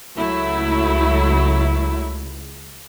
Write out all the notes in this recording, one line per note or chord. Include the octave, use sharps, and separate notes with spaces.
C#2 F#3 A3 E4